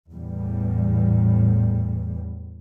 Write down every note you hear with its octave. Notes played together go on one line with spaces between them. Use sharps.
E2 A2 G3